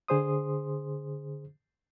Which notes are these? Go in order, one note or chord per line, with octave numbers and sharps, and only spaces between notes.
D3 G#4 C5 C6 D#6